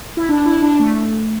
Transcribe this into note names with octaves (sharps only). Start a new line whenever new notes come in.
E4
D4
E4
D4
A3